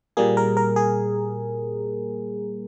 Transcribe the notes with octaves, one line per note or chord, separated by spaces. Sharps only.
A#2 G3 A#3 G#4
A#4
A#4
G#4